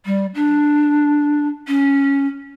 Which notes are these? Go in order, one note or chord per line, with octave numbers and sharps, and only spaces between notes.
G3
D4
C#4